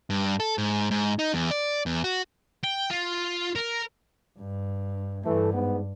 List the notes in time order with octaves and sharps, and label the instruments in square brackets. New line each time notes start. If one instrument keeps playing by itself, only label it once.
[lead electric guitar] G2
A4
G#2
G#2
D#4
E2
D5
E2
F#4
[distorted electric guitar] G5
F4
A#4
[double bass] G2
[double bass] G2 [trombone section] E3 A3
[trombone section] G#2 B3